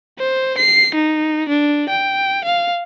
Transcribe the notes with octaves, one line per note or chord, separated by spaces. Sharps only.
C5
C7
D#4
D4
G5
F5